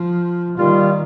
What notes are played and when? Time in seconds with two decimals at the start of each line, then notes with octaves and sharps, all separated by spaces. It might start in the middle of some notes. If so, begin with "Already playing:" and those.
Already playing: F3
0.57 D#3 G3 A#3 F4